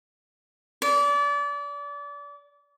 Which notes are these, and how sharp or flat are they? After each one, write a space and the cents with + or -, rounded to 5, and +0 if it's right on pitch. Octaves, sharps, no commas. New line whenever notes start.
D5 -30